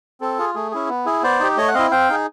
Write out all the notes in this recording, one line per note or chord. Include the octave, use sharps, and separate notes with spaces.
C4 A4
F4 G#4
A3 G#4
C#4 E4 G#4
B3
E4 G#4
B3 C5 D5
D#4 G4
A3 C#5 D#5
F#5
C4 E4 D#5 F5
C4 F5 G5
D#4 G#4